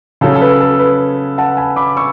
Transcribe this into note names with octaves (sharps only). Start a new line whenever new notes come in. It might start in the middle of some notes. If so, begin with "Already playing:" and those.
C#3 F#3 A4 C#5
A4
B4
A4
B4
F#5 A5
G#5 B5
B5 D6
C#6 E6